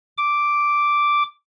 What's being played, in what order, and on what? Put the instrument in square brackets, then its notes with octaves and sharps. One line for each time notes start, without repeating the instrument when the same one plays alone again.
[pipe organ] D6